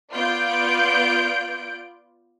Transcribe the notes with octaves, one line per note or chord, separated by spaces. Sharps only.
B3 F4 D5 G6 D7